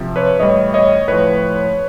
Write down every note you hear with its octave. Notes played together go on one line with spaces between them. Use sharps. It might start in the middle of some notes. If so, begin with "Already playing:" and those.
Already playing: C3 F3
B4 C#5
A2 E3 G3 C#5 D#5
C#5 D#5
A2 F3 B4 C#5